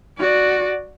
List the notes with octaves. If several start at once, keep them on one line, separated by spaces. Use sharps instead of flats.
F#4 D5